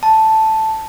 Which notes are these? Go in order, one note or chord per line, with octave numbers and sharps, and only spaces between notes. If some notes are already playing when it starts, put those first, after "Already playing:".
A5